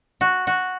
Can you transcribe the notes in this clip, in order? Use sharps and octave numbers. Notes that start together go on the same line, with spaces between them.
F#4
F#4